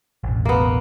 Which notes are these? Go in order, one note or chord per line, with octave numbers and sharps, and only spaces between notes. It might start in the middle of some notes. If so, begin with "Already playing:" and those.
E1 A1
A#3 B3